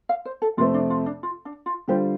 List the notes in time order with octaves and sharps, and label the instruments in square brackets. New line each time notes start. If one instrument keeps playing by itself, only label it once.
[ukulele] F5
C5
A4
[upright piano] F2 C3 A3 C4 [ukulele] F4
[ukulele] D4
F4
D4
F4
D4
F4
[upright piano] D3 G3 F4 C5 [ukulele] G4